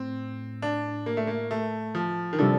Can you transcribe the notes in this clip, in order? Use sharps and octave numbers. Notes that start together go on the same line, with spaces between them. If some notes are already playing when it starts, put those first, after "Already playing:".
Already playing: A2 C4
D4
A#3
A3
A#3
A3
F3
D#3
C3 F3 G3 D4 A4